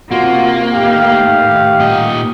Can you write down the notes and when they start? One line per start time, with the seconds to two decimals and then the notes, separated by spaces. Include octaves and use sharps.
0.11 C3 A#3 F4 F#4
0.73 A2 D#3 G4 F5
1.80 A#2 D#5